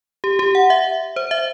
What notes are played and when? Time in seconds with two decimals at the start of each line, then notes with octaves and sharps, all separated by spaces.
0.24 G4
0.39 G4
0.55 F#5
0.70 E5
1.16 C5
1.31 E5